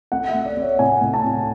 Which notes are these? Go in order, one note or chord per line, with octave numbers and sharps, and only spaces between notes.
A3 F#5
E5
A3
D5
A3
C#5
A2 G#5
A2
A5
A2